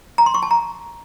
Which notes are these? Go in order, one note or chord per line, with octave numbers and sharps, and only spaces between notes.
A#5
C6
C#6
A5
A#5